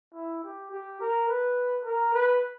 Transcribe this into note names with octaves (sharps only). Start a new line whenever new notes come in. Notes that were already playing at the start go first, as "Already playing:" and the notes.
E4
G4
G4
A#4
B4
A#4
B4